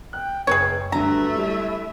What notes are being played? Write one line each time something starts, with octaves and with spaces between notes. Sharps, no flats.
G5 F#6
F#1 G#4 B4 C#5 G5
G2 D3 F#3 A3 B4 E5 A#5
G3 E4